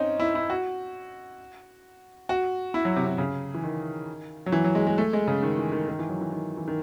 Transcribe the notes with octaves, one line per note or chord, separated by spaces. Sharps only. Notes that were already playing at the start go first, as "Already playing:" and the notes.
Already playing: C4 C#4 D#4
E4
E4
F#4
F#4
E4
F#3
C3
C3
C#3
E3
D#3
F#3
E3
F#3
G#3
G#3
A3
G#3
C#3
D#3
E3
D#3
D#3
E3
F#3
E3
D#3
E3
D#3